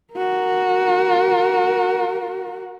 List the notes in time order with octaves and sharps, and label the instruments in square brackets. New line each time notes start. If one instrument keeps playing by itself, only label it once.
[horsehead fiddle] F#4 A#4